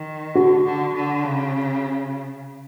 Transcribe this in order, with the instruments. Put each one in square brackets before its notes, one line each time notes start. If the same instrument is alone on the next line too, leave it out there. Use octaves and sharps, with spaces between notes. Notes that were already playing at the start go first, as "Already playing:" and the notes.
Already playing: [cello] D#3
[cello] D3 [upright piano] F#4
[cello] D3
D3
C#3